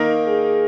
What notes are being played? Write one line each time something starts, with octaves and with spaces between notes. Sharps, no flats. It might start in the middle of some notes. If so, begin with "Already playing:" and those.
Already playing: D#3 A#3 D#4 A#4
G#4